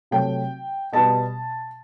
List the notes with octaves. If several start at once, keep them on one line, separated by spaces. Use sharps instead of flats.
C3 F#3 A3 G5
B2 G3 B3 A5